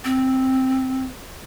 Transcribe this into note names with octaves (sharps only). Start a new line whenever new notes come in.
C4